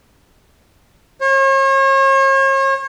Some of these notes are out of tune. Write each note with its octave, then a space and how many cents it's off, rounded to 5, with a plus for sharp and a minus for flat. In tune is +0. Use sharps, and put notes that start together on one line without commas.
C#5 -40